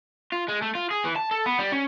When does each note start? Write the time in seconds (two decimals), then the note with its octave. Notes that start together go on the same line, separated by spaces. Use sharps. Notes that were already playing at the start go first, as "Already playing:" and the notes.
0.32 F4
0.49 G#3
0.62 A3
0.75 F4
0.91 G#4
1.05 E3
1.16 A5
1.31 A4
1.46 B3
1.59 G3
1.72 C#4